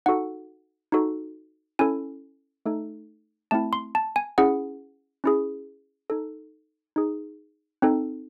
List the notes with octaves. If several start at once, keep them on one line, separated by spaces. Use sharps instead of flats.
D#4 F#4 A4 F#5
D#4 F#4 A4
C#4 E4 A4 G#5
A3 D#4 A4
A3 C4 E4 A5
C6
A5
G#5
C#4 E4 G#4 F#5
C#4 E4 G#4
D#4 A4
D#4 G#4
C4 D#4 A4